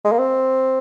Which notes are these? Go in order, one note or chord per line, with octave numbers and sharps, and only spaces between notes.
G#3
A#3
C4